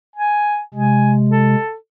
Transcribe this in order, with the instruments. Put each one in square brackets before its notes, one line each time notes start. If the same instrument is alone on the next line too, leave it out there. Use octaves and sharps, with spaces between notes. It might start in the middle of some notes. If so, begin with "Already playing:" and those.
[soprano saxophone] G#5
[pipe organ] C3 G#3 [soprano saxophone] G#5
[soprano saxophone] A4